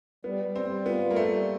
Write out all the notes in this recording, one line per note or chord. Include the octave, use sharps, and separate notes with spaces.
G3 B3
G3
C4
G3
B3 F4
G3 A#3
A3
G3